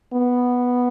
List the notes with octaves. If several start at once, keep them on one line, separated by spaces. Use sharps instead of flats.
B3